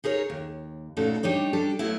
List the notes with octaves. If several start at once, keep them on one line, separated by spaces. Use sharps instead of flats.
D#4 G#4 A#4 C#5
D#2
A#2 C#3 A3 D#4 F#4 A4
G3 D4 D#4 C#5
G3 D4 G4 A4
F#3 A3 B3 E4